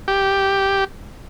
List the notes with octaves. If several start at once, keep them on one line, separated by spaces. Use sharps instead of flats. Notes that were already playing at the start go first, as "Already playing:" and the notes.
G4